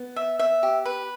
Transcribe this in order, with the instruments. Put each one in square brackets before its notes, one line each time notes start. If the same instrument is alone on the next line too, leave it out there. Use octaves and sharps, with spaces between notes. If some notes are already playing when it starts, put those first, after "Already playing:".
Already playing: [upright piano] B3
[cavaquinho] E5
E5
G4
B4